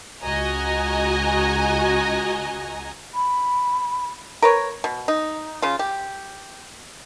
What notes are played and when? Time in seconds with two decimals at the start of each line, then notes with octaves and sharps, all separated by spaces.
0.24 C#2 F#4 D#5 G#5 A#5
3.15 B5
4.42 A#4 B4 C#5
4.84 B2
5.08 D#4
5.62 C#3 F4
5.79 G4